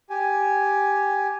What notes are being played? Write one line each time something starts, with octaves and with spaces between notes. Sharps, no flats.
G4 G#5